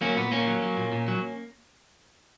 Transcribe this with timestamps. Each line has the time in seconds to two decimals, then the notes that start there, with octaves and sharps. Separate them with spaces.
0.01 F#3 A#3 C#4
0.17 A#2 B3
0.31 A#2 A#3 C#4
0.47 F#3
0.62 F#3
0.77 A#2
0.92 A#2
1.08 F#3